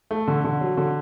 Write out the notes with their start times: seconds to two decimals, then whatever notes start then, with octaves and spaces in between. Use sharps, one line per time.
0.11 A3
0.28 D3
0.44 D3
0.61 F#3
0.77 D3